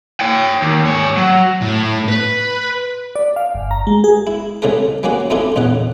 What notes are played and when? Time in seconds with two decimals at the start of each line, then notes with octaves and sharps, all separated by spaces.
0.21 C#5 G5
0.62 D#2
0.85 G#2 C#5
1.17 F#3
1.62 A2
2.08 B4
3.16 D5
3.36 F5
3.55 G1
3.71 A#5
3.87 G#3
4.04 G#4
4.27 E4
4.62 C2 C#3 G#3 A3 A#4
5.03 G3 G#3 A#3 C#4 F#4
5.30 F2 G#3 A3 D4 E4 F4
5.56 A#1 E2 C#3 F#5